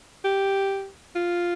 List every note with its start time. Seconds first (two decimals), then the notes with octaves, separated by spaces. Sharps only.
0.24 G4
1.15 F4